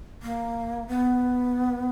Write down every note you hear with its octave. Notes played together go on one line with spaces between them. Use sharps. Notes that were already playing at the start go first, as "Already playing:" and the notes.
A#3
B3